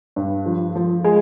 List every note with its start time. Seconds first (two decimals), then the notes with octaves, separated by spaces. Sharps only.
0.16 G2
0.46 F3
0.75 F3
1.04 G#3